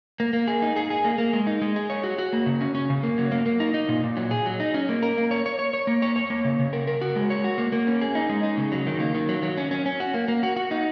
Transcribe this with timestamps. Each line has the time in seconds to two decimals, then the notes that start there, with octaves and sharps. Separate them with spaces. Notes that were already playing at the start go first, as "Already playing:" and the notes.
0.20 A#3
0.33 A#3
0.48 G#4
0.62 D#4
0.76 G#4
0.90 G#4
1.05 A#3
1.18 A#3
1.33 G#3
1.47 D#4
1.62 G#3
1.76 G#4
1.90 C#5
2.04 F#4
2.18 F#4
2.33 A#3
2.46 C#3
2.61 C#4
2.75 C#4
2.90 C#3
3.03 A#3
3.18 F#3
3.32 A#3
3.46 A#3
3.60 D#4
3.74 D#4
3.89 A#2
4.03 A#2
4.17 F#3
4.31 G#4
4.46 F#3
4.60 D#4
4.74 C#4
4.89 A#3
5.03 A#4
5.17 A#3
5.31 C#5
5.46 C#5
5.59 C#5
5.73 C#5
5.87 A#3
6.02 C#5
6.16 C#5
6.30 A#3
6.45 C#3
6.59 C#3
6.73 A#4
6.87 A#4
7.01 F#4
7.16 G#3
7.30 C#5
7.44 F#4
7.58 A#3
7.72 A#3
7.87 C#4
8.01 G#4
8.15 D#4
8.29 G#3
8.43 D#4
8.58 C#3
8.72 F#3
8.87 D#3
9.00 A#3
9.15 D#3
9.29 F#3
9.43 F#3
9.58 C#4
9.71 C#4
9.86 C#4
10.00 F#4
10.14 A#3
10.28 A#3
10.43 F#4
10.56 F#4
10.71 D#4